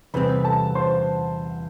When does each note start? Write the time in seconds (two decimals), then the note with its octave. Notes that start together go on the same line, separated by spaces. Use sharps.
0.14 E2 C3 G3 C4 B4 B5
0.45 A4 A5
0.75 C5 C6